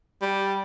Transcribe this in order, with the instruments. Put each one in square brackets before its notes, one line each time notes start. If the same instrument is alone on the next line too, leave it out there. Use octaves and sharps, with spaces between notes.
[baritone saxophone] G3